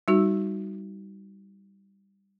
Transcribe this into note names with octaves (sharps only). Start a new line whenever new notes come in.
G3 D#4 F#4